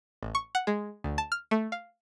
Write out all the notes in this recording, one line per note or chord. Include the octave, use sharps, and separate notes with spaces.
A1
C#6
F#5
G#3
D2
A5
F6
A3
F5